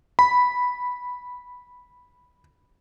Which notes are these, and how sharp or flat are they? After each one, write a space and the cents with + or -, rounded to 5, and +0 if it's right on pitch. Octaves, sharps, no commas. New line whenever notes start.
B5 -5